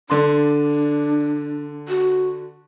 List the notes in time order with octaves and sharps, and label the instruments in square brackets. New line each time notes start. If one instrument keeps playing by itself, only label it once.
[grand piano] D3 D5 C6 [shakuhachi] D4
[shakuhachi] F#4